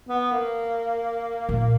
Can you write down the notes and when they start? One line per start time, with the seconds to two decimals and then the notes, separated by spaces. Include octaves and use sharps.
0.09 B3
0.32 A#3
1.49 A#2